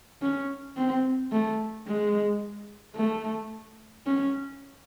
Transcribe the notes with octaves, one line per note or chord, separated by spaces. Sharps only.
C#4
C4
A3
G#3
A3
C#4